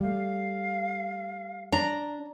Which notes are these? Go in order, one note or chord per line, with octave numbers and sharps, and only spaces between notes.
G3 A3 F5
D4 A#5